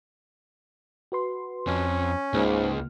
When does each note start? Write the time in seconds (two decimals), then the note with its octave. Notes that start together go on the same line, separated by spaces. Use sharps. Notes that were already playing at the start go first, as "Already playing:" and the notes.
1.12 F#4 B4 C6
1.67 F2 C#4
2.34 C#2 G#2 A#3 F6